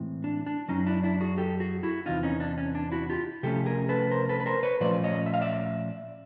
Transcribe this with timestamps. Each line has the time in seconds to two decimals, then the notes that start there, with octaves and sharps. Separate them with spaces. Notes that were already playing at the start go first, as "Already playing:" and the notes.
Already playing: A2 E3 G#3 C4
0.24 D4
0.47 D4
0.68 F#2 C#3 F#3 C#4 D#4
0.86 D4 E4
1.03 D4 E4
1.21 F#4 G#4
1.38 G4 A4
1.60 F#4 G#4
1.83 E4 F#4
2.06 E2 C3 E3 D#4 F4
2.23 C#4 D#4
2.40 D4
2.58 C#4
2.75 D4
2.92 E4 F#4
3.10 F4 G4
3.43 C3 F3 A3 C#4 G4 A4
3.66 G#4 A#4
3.89 A4 B4
4.11 A#4 C5
4.29 A4 B4
4.40 B4
4.46 A#4 C5
4.63 B4 C#5
4.80 A#2 F3 A3 C#4 C5 D5
5.04 C#5 D#5
5.26 E5
5.34 F5
5.41 D5 E5